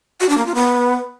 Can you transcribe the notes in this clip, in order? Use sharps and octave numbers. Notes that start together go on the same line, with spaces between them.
F#4
D4
A#3
F4
B3